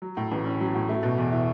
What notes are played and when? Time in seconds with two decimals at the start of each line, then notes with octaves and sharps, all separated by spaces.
0.02 F#3
0.17 A2
0.32 A1
0.45 C#4
0.60 F#3
0.75 A2
0.89 A3
1.03 B2
1.18 E2
1.32 E4